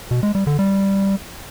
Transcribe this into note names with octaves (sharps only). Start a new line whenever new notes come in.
B2
G#3
G3
D3
G3